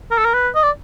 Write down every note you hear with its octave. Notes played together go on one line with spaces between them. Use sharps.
A#4
A4
A#4
B4
D#5
D5